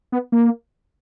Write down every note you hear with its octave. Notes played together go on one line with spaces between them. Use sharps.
B3
A#3